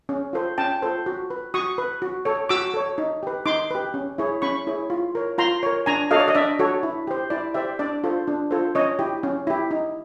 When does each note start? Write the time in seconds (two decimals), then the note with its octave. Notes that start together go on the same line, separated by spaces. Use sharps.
0.09 C#4
0.33 F4 A4 C5
0.58 C#4 G5 A5
0.82 F4 A4 C5
1.06 F#4
1.30 B4
1.54 F#4 C#6 D#6
1.78 B4
2.02 F#4
2.25 A4 C#5
2.49 F#4 D6 E6
2.74 A4 C#5
2.98 D#4
3.23 G4 B4
3.46 D#4 C6 D6
3.71 G4 B4
3.94 C#4
4.18 E4 G#4 C#5
4.42 C#4 B5 C#6
4.67 E4 G#4 C#5
4.90 F4
5.15 A#4 C#5
5.38 F4 A#5 C6
5.63 A#4 C#5
5.86 D4 G#5 A#5
6.11 F#4 A4 C#5 D#5 F5
6.20 D5
6.28 D#5
6.35 D4 D5 E5
6.59 F#4 A4 C#5
6.83 E4
7.07 G4 C5
7.30 E4 D5
7.54 G4 C5 D5 E5
7.79 D4 D5
8.04 F4 A4 C5
8.27 D4
8.51 F4 A4 C5
8.75 C#4 C#5 D#5
8.99 E4 G4
9.23 C#4
9.47 E4 G4
9.71 D#4